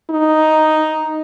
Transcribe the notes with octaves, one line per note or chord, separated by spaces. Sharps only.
D#4